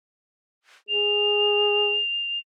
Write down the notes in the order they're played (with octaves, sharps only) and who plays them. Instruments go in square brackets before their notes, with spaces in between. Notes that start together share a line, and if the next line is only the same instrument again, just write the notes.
[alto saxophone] G#4 [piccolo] F7